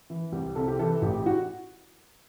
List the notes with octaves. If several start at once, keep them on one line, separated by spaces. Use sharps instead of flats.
E3
C2 G4
C3 A4
G4
E3 A4
A1 G4
G4
F#4